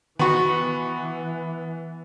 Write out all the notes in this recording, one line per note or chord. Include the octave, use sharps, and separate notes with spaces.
D#3 E3 B3 F#4 B5 C#6